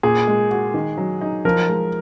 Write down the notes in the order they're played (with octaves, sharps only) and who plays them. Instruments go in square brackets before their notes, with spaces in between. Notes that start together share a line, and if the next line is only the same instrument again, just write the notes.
[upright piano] A#2 [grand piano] G#4
[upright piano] G#3
F#4
D#3
F#3
D#4
[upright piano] F3 [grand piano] A#4
[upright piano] G#3